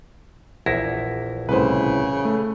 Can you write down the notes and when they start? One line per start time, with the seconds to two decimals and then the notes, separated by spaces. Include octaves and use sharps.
0.66 A#1 E2 E4 A#6
1.49 C2 A2 C#3 B4 C5
2.25 A3